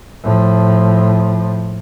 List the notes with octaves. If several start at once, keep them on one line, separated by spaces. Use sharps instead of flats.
A2 F3